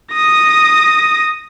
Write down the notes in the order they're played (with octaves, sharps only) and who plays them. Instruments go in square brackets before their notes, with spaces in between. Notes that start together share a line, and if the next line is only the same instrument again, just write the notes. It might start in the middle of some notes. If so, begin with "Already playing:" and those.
[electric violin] D#6 A#6